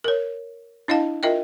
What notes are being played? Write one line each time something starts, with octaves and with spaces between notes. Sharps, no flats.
A#4 C#5
D4 E4 D#5 F5 A5
F4 A#4 D#5 E5 G5